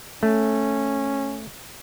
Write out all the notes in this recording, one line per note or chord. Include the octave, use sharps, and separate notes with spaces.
A3 C#4